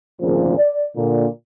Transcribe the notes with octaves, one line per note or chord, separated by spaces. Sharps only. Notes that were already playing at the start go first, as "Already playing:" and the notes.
G#1 D2 A#2 C#3 F3
D5
A#2 D3